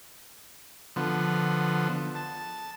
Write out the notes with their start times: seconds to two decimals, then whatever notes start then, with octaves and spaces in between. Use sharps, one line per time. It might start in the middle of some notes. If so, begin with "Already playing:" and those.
0.96 D3 F3 B3
2.15 A5